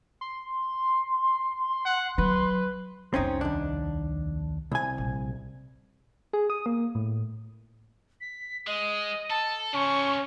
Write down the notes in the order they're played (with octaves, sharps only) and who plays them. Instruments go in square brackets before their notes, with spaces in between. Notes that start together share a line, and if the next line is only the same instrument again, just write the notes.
[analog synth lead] C6
[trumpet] F#5
[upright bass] F#3 [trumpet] B4
[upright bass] C2 F2 [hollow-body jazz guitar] C4 C#4 D#4
[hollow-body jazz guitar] D#2 D4
C2 G#5
[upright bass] A#1
[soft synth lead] G#4
D#6
A#3
A2
[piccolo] B6
[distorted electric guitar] G#3 [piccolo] D#5
[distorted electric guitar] A4 [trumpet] A5
[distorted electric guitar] C#3 C5 [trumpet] C#4 [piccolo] C#6